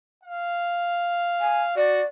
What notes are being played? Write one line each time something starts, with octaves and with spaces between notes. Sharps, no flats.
F5
G#5
F#4 D5